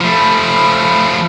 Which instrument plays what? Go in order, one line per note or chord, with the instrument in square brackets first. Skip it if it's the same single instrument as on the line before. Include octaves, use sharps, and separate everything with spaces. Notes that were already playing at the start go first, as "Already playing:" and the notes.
[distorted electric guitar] F3 A3 [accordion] B5